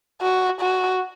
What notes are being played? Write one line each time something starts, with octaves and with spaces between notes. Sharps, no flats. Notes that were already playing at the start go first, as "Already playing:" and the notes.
F#4
F#4